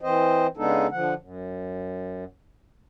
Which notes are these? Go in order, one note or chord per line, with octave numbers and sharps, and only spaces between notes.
E3 C4 C5 D#5
C#3 G#3 B3 D4 D#4 A4
D3 F3 F#5
F#2